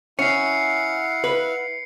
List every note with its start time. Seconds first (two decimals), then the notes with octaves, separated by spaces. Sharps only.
0.19 C#4 E4 F5 F#5 C7 C#7
1.24 B4